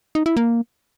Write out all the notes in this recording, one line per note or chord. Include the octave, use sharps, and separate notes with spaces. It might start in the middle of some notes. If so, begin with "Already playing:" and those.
D#4
E4
A#3